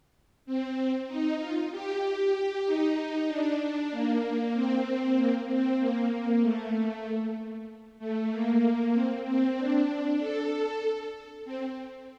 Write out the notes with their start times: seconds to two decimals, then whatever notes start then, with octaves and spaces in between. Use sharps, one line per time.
0.46 C4
0.77 C4
1.08 D#4
1.39 F4
1.72 G4
2.02 G4
2.66 D#4
3.28 D4
3.91 A#3
4.54 C4
5.17 A#3
5.48 C4
5.80 A#3
6.42 A3
7.99 A3
8.31 A#3
8.93 C4
9.25 C4
9.57 D4
10.20 A4
11.45 C4